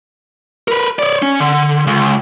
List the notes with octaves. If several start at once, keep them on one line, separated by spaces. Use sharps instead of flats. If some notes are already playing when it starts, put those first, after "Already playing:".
A#4 B4
C#5 D5
C#4
D3
C#2